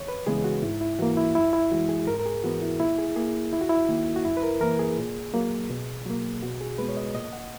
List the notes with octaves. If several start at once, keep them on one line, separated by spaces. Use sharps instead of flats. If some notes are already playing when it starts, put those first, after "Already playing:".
Already playing: D#2 C#5
B4
C#3 E3 G#3 B3 G#4
F#4
G#2 E4
E4
E3 A#3 F#4
E4
F#2 E4
E4
E3 G#3 F#4
G#4
G#2 A#4
A#4
G#4
E3 B3 F#4
E4
A#2 E4
G#4
A#3 G#4
D#2 E4
F#4
E4
D#3 A#3
F#4
F#2 E4
B4
A#4
E3 A#3 A#4
G#4
A#2
F#3 A#3
B2
F#3 A#3
B2 F#4
G#4
G#3 B3 B4
C#5
D#5
A#2 D#5
F#5